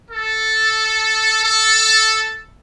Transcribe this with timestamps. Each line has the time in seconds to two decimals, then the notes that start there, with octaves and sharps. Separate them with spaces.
0.10 A4
1.44 A4